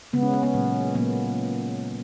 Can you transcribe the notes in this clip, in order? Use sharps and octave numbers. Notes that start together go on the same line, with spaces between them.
C#3 G#3 B3 C#4
C#4
B3
A#2 F#3 A#3
A#2 F#3 A#3 B3